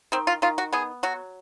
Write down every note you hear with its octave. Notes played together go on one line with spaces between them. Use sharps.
D#3 C4
F4
D#3 F4
F#4
B3 G#4
F#3 F#4